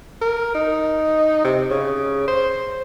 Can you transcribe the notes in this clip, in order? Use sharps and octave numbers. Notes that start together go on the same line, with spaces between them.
A#4
D#4
C3
C#3
C5